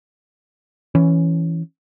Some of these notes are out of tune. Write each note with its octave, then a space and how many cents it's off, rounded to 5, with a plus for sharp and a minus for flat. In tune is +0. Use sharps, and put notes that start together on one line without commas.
E3 +0 C#4 +0